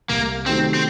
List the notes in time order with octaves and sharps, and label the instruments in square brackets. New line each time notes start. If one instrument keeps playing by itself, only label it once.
[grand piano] C2 [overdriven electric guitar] A#3
[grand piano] C3 D#3 F#3 A3 [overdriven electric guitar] C4
[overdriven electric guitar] C4